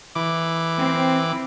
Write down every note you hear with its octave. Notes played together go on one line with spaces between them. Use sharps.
E3 D6
C4